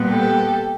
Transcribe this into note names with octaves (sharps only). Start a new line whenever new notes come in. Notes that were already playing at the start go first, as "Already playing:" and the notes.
Already playing: A#2 G3 B3
G4 A4